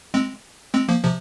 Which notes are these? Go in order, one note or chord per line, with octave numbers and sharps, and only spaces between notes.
G#3 C4
G#3 C4
F3 A#3
C3 F3